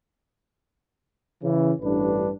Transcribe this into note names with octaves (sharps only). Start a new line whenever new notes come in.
C#3 E3
A1 G2 D4 B4